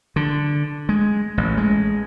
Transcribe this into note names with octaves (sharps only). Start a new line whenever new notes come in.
D3
G#3
A1
G#3